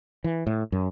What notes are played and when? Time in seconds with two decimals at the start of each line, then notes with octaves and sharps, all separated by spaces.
0.24 E3
0.47 A2
0.72 F#2